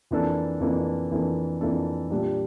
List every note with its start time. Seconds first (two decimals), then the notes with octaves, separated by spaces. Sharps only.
0.11 F2 E3 A#3 D4 A4
0.60 F2 E3 A#3 D4 A4
1.11 F2 E3 A#3 D4 A4
1.61 F2 E3 A#3 D4 A4
2.11 A#2 G3 D4